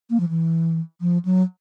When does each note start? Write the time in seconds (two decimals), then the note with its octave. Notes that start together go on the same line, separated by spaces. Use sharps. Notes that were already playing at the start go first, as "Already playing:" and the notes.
0.10 A#3
0.20 F3
0.29 E3
1.01 F3
1.25 F#3